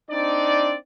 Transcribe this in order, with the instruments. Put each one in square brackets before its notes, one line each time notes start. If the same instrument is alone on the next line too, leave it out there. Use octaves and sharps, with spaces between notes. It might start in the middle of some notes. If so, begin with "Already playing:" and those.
[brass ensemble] C4 D4 D#4 D5